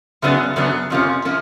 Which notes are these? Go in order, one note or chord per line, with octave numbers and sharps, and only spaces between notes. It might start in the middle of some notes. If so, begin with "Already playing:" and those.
F#2 C#3 F#3 B3 D4
F#2 C#3 F#3 B3 D4
F2 C3 F3 A#3 C#4
C3 F3 A#3 C#4